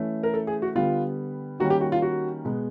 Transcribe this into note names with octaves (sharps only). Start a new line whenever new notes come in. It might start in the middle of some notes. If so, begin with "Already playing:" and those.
Already playing: E3 A3 C#4
A#4
A4
G#4
F#4
D3 G3 B3 F4
D#3 G3 A#3 C#4 F#4
G4
F#4
F4
F#4
B2 G#3 B3